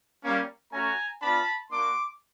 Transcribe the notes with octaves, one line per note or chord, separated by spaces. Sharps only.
G3 A#3 C#4
A3 C#4 F#4 G#5 A#5
B3 D4 F4 A5 B5
A#3 D4 F#4 C6 D6